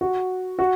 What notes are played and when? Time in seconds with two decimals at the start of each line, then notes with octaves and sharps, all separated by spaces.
0.01 F#4
0.59 F#4